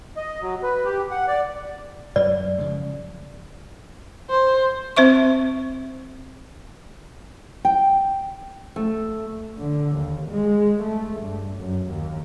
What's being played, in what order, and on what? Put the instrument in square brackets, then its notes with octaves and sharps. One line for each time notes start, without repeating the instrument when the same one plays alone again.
[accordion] D#5
F#3
B4
G4
F#5
D5
[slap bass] F#2 [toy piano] D5
[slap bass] C#3 F3 G#3
[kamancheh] C5
[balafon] C4 C5 E5 C#6
[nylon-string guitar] G5
A3
[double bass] D3
D#2
G#3
A3
G2
F#2
D#2